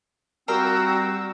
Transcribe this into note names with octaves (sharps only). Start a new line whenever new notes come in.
G3 C4 F4 F#4 A#4 G5 E6